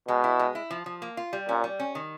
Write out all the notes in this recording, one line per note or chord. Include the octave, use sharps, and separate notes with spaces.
B2 G#3
E4
G#3
E4
F3
F3
A#3
F4
G3
A#2 C#4
G3
C#4
D#3